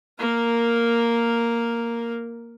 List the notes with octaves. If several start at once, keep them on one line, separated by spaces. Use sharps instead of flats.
A#3 A#4